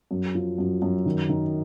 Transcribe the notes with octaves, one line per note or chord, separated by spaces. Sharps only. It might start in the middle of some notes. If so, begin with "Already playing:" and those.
F#2
F3
F#2
F#2
D#3
D#3